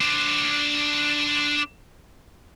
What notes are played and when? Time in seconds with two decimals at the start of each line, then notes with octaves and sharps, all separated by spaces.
0.01 D4 C5